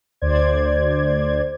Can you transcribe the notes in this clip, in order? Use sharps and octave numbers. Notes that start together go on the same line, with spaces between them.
D2 C5 D5 G#6